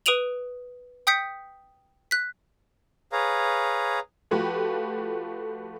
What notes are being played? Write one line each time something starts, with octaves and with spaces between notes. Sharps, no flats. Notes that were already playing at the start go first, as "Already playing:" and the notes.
B4 D#6 D7 D#7 F7 F#7
G5 D#6 G6 B6 C#7
F#6 B6
G#4 B4 C#5 F5 A#5
F3 A3 F#4 G4 B4